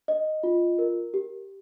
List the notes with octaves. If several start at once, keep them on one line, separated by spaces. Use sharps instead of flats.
D#5
F4
A#4
G4